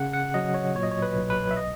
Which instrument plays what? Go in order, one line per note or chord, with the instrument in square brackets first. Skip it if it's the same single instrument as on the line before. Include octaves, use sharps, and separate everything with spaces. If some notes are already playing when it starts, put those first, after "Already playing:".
Already playing: [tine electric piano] C#3 F#5
F#5
F#3 D#5
C#5
A#2 C#5
D#5
C#5
B4
B1
B4
E5
D#5